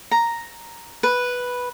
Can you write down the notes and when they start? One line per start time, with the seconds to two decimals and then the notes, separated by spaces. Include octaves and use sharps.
0.11 A#5
1.03 B4